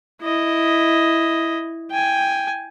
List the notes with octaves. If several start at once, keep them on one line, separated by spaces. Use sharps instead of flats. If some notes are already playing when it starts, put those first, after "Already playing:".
E4 D#5
G5 G#5